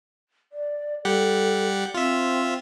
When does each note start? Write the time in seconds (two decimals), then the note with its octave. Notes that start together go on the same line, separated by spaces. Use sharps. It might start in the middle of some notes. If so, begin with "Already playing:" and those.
0.53 D5
1.05 G3 G4 A4 F#5
1.95 C4 F4 E5